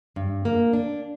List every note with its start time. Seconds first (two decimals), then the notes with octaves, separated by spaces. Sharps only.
0.16 G2
0.45 A#3
0.73 D4